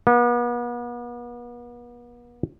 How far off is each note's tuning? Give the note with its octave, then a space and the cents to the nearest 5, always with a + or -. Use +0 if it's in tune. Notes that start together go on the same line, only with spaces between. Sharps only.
B3 -40